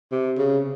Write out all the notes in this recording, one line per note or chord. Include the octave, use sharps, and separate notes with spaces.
C3
C#3